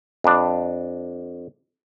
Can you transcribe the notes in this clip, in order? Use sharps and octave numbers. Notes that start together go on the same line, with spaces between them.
F2 D4